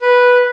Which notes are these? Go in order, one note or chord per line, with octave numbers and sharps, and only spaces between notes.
B4